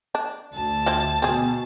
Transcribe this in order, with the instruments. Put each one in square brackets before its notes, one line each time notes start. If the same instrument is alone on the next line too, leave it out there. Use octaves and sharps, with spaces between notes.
[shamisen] D4
[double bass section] D2 [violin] A5
[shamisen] F3 C4 E4
[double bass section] B2 [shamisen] C4 G#4